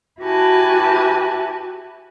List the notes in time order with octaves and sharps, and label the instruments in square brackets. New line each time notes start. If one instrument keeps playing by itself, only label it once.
[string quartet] E4 F#4 G4 B4 G#5 A5